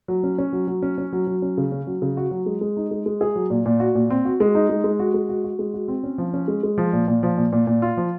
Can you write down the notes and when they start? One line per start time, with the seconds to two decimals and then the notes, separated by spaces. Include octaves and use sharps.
0.08 F#3
0.24 C#4
0.38 C#4
0.53 F#3
0.67 F#3
0.82 C#4
0.98 C#4
1.13 F#3
1.27 F#3
1.42 C#4
1.58 C#3
1.72 C#4
1.87 F#3
2.02 C#3
2.17 F#4
2.31 F#3
2.46 G#3
2.61 G#3
2.77 D#4
2.91 G#3
3.06 G#3
3.21 G#4
3.36 F#3
3.50 A#2
3.66 A#2
3.80 F#4
3.95 A#2
4.10 C4
4.25 F#4
4.40 G#3
4.55 D#4
4.69 G#3
4.84 G#3
4.99 F#4
5.14 G#3
5.29 F#4
5.44 F#4
5.59 G#3
5.74 F#4
5.88 C4
6.04 C#4
6.18 F3
6.34 C#4
6.48 G#3
6.63 G#3
6.78 F3
6.93 A#2
7.08 A#2
7.23 F3
7.38 A#2
7.52 A#2
7.67 A#2
7.82 F4
7.97 F3